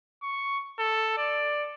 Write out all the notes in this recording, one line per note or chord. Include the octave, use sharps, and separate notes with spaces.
C#6
A4
D5